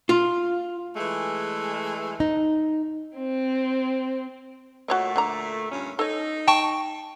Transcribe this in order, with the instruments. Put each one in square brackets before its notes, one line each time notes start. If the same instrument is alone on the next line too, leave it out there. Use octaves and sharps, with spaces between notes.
[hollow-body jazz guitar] F4
[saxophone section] E3 G#3 A3
[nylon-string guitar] D#4
[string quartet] C4
[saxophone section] A#2 A3 [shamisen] F#4 C#5 D#5
[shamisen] D3 D5 A#5
[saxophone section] G2 A#2 C#4
[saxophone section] D#4 [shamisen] A4 C#5
[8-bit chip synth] G5 A5 C#6